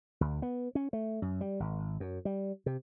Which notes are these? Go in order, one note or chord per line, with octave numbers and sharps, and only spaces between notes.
D2
B3
C#4
A3
F#2
G3
G#1
F#2
G3
C3